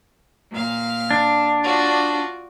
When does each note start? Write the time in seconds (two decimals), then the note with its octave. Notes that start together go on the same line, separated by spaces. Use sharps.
0.50 A#2 F5
1.11 D4
1.63 F4 F#4 D5